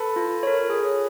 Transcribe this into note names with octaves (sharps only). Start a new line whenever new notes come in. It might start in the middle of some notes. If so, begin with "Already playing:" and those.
Already playing: A4 B4
F4
A#4 C#5
G#4